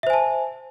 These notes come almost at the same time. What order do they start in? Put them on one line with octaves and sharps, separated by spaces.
E5 C5 G#5 A5